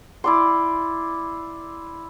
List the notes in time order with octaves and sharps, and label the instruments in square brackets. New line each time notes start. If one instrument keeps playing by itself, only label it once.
[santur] E4 D5 C6